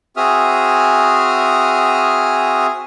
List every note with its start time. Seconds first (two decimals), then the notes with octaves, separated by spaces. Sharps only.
0.17 C4 F#4 G#4 E5 D#6 F6